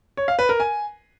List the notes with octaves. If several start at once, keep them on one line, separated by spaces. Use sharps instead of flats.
C#5
F5
B4
A#4
G#5